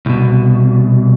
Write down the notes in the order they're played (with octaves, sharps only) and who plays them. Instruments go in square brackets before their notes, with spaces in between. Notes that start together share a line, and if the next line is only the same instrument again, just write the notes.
[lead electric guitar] C2 B2